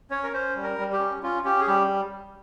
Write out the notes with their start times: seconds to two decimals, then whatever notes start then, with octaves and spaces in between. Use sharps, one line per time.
0.10 C#4 C#5
0.24 A#4
0.32 C#4 C5
0.56 G3
0.63 A#4
0.78 G3
0.93 G4
0.99 C#4
1.23 C#4 F4
1.44 C#4 G4
1.60 G#4
1.67 G3 G4